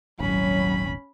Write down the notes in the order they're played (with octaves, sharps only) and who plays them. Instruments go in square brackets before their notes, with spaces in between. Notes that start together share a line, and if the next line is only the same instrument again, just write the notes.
[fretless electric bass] D#1 G#1 [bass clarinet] F#3 [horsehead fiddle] C#4 B5